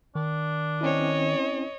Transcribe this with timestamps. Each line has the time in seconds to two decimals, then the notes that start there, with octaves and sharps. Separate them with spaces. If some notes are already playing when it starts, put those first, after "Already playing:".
0.15 D#3 D4
0.81 C4 C#4 E4 C#5 D#5